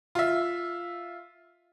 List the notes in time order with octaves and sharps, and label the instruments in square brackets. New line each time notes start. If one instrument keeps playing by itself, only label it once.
[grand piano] F4 E5